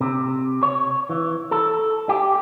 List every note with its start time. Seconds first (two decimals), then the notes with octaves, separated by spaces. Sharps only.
0.01 C3
0.63 C#5
1.10 E3
1.51 A4
2.09 G4